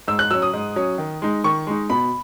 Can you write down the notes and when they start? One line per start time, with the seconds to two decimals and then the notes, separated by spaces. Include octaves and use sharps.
0.08 G#2 E6
0.19 F#6
0.30 F#3 E6
0.34 C#4
0.42 D#6
0.53 G#2
0.76 F#3 C#4
0.98 D#3
1.22 G#3 D#4
1.44 D#3 C#6
1.67 G#3 D#4
1.90 B2 B5